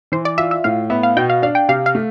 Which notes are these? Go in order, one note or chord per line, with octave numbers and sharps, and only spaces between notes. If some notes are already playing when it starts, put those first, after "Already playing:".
E3 C5
D5
F4 E5
E5
A2 F5
B3 E5
F5
B2 G5
F5
D4 F5
G5
C3 F5
F5
A3